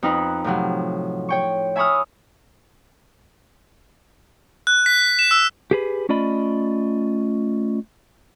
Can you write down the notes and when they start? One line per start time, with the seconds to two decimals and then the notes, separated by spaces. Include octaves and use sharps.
0.03 F2 D#4 F4 B4
0.44 A2 C3 F3 F#3
1.29 C#5 G5 C#6
1.76 E5 G#5 B5 C#6 D#6 F6
4.67 F#6
4.86 B6
5.19 E7
5.31 E6
5.71 G4 G#4 B4
6.09 A3 C#4 F4 D5 D#5 B5